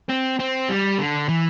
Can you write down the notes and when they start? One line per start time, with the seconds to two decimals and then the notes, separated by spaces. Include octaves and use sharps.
0.09 C4
0.39 C4
0.69 G3
0.99 D3
1.29 E3